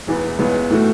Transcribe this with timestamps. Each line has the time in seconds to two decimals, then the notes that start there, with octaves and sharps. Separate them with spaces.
0.07 E1 E2 E3 B3
0.39 C#2 C#3 E3 B3
0.71 A2 E3 A3 F#4